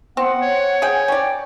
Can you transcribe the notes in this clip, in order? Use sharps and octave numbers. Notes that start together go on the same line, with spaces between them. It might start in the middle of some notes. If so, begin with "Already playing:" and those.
B3 C4 F#5
C#5
G#4 G5
C#4 D5 G5